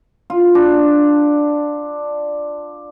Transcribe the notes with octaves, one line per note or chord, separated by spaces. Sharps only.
F4
D4